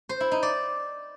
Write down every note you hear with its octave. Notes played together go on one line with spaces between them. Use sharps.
C5
E4
D#4
D5